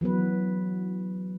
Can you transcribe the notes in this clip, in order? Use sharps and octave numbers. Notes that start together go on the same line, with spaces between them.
E3 F#3 B3 B4